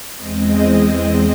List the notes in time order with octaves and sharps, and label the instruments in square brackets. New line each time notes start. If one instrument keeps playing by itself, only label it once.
[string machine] E2 G#3 C4 D#5